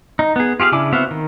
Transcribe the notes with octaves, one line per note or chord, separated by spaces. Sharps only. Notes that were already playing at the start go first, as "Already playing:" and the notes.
D#4
B3 G#4
F4 G4 G#4 F5
C#3 D4 E4 G#5 D6
B3 C4 F#4 E5 F5
D#3